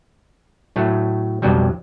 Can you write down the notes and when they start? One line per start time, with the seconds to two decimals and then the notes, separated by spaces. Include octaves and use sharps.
0.76 A2 F#3 A3
1.42 B1 F2 F#3 G3